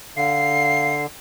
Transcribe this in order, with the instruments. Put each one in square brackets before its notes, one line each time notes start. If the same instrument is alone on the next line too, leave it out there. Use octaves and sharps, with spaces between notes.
[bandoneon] D3 [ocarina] F5 [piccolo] C7